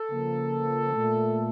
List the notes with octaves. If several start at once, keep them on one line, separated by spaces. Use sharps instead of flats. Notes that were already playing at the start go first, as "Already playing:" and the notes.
Already playing: A4
C#3 F3 A#3
A#2 A3